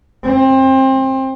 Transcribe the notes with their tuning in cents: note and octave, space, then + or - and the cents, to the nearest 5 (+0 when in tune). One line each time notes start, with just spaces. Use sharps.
C4 +25